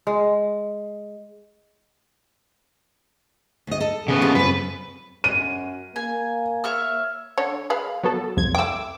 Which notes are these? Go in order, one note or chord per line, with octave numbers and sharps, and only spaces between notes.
G#3
D2 D#5
A4
C#3 B3
F4 G4 A4
F#2 C4 B4
F#2 D#7
A#3 G#5
C#5 E5 F6
D3 C#5
G#3 B4 F5
F#3 B3 A4
C2 F2 G#6
A3 G5 D6 E6